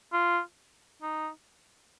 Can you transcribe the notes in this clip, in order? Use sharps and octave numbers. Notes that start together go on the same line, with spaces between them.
F4
D#4